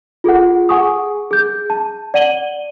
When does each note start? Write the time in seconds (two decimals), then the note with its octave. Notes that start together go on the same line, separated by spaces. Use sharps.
0.24 F4 G#4 A4 F#5
0.69 G#4 F#5 G#5 C#6 D#6
1.31 G#4 G6
1.70 A5
2.14 D5 F#5 D#7 F#7 G7